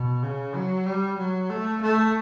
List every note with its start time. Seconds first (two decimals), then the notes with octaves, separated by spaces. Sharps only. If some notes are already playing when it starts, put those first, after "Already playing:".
Already playing: B2
0.23 C#3
0.55 F#3
0.86 G3
1.18 F#3
1.50 A3
1.82 A3